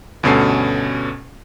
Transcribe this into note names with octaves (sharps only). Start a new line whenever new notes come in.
D2 G2 B2 C#4 A4 C7